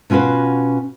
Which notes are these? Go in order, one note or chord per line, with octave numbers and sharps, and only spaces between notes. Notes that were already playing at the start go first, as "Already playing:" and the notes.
B2 C#4 F4 F#4 B4